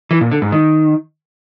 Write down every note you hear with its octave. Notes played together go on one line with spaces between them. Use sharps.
E3
A#2
D3
G#2
D#3